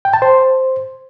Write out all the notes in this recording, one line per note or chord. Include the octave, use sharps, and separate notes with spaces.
G5
A5
C5